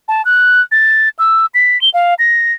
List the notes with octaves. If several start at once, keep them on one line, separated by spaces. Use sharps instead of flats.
A5
F#6
A6
E6
B6
G7
F5
A#6